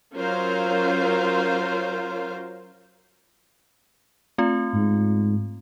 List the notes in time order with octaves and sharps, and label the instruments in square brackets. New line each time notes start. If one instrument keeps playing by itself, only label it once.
[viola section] F#3 C#4 F4 A#4 C5 F5
[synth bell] A3 C4 F4
[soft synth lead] G#2